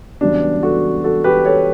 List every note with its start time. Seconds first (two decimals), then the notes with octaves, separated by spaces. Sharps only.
0.21 E1 E2 C#3 G3 B3 D4
0.63 F#4 A4
1.04 F#4 A4
1.24 G4 B4
1.45 A4 C#5